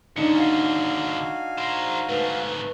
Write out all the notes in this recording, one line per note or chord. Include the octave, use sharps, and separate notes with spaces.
D#2 D3 D4 D#4 C#7
F#4 F5 G#5
A#4 C5
G#2 A3 B4